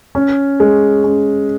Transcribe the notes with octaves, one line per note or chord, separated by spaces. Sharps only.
C#4
G#3
C#4